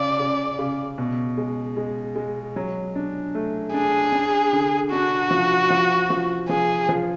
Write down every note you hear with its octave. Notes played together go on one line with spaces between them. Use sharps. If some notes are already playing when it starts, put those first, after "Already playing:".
Already playing: C#3 D5
C#3
C#3
B2
G#3
G#3
G#3
F#3
D4
A3
D4 G#4
D4
D3
D4 F#4
F3
F3
F3
F3 G#4
F3